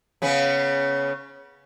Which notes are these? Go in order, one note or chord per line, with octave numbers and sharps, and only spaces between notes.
C#3 B3 C#4